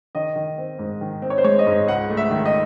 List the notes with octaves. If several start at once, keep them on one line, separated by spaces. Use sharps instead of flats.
D#3 D#5
D#3
C4
G#2
D#3
C4
C#5
C5
G#3 C#5
D#5
G#2
C#2 F#5
A3
E5
D#3
D#5